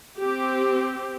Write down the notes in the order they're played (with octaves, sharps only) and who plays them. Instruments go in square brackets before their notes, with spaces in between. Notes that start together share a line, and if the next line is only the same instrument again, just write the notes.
[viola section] C4 G4